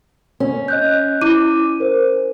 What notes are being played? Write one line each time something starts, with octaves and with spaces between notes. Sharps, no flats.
C#4
D#5 F#6 G6
E4 D6 D#7
A#4 C5